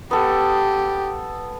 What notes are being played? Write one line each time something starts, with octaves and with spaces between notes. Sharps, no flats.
B3 G4 A4